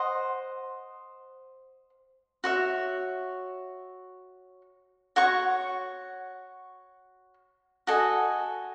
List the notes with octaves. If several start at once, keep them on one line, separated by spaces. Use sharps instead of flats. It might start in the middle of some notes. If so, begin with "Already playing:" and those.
Already playing: C5 D#5 F#5
F#4 C#5 E5
F#4 C#5 F#5 C#6
F#4 A4 D#5 G#5